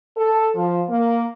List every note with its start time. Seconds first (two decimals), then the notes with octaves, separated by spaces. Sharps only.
0.16 A4
0.55 F3
0.88 A#3